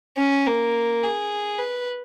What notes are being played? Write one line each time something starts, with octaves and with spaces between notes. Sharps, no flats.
C#4
A#3
G#4
B4